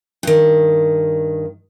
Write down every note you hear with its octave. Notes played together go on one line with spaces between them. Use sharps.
G2 D#3